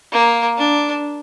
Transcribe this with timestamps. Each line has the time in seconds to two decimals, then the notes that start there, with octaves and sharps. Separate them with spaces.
0.12 A#3
0.58 D4